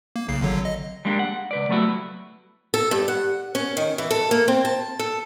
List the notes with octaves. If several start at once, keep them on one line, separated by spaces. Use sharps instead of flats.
A#3
B1 C#3 C7
G#1 D3 F#3
D#5
G3 G#3 A#3 D4 G4
F#5
C#2 B4 D5
F#3 G3 A3 B3 E4 F#4
A4
G2
F#5
C#4
D#3
E3
A4
A#3
C4
A5
A4